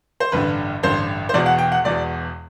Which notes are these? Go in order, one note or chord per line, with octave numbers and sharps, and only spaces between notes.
C5
A1 G2 D3 B4
A1 G2 D3 C5
C5
E1 E2 B2 D5
F#5
G5
F#5
E1 E2 B2 D5